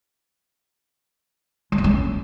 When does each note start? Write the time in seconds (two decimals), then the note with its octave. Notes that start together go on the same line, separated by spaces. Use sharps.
1.72 G#3
1.78 C#3
1.84 C#4